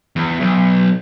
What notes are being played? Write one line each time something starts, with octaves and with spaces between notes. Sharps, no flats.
E2
B1